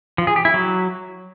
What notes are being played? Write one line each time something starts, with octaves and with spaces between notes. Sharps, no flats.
F3
G#4
G4
E4
F#3